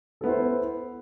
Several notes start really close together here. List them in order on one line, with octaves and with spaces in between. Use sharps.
A4 B3 E4 C5